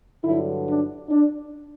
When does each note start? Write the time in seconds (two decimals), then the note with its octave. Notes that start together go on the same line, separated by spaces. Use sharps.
0.24 G2 D3 F#3 E4
0.67 D4
1.10 D4